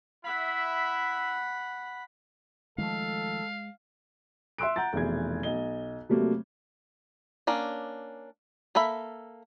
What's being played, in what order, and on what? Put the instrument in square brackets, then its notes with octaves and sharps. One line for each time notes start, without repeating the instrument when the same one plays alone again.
[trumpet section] E4 E5 [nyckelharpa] F#5 B5
[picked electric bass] D#3 F3 A3 [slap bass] G#3 [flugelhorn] A4 [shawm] F5
[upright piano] E5 C6 E6 F#6 D7
F#5 A#5 G6 A6
F1 B2 E3 G#4 G#6
B1 D#5 G7
C3 F#3 G3 A3 A#3
[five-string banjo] A#3 C#4 D4
A#3 A4 E5 B5